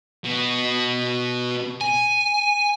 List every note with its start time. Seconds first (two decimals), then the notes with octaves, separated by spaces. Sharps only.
0.24 B2
1.81 G#5